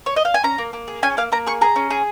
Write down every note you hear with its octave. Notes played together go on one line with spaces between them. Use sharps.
C#5
D#5
F5
G#5
C#4 A#5
A#3
A#3
G#4
C#4 G#5
A#3 F5
A#3 A#5
G#4 C#6
G#4 A#5
C#4
G#4